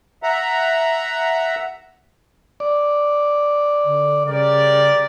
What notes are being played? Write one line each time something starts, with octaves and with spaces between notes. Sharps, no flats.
E5 F#5 A#5
D5
D3
C#3 G3 A#4 D5